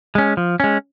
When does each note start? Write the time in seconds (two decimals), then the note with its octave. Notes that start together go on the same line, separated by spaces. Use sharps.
0.15 G#3 C#4
0.37 F3
0.60 G#3 C#4